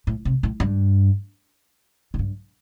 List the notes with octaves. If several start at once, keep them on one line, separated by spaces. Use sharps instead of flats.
A2
C3
A2
G2
A2
G2